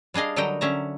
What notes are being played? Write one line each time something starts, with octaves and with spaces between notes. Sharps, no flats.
G3 D4 G#4 D#5 F5
D3 F#3 G3 A#4 D#5 G5
D3 C#4 E5 A#5